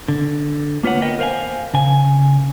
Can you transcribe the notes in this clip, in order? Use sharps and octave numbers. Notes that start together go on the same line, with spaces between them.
D3
A#3 F4 B4 C#5 F#5
B3 A#4 D#5 G5
A#4 C5 F5 F#5 G#5
C#3 G#5